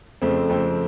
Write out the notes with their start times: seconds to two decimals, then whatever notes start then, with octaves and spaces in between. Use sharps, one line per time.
0.22 F2 C#3 A3 C4
0.49 F2 C#3 A3 C4